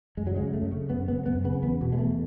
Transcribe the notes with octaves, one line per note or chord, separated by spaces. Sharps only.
F#2 G#3
F#3
C#3 G#3
F#2 A3
C#3
F#2 B3
C#3 B3
F#2 B3
C#3 B3
E2 B3
B2
G#3
E2 A3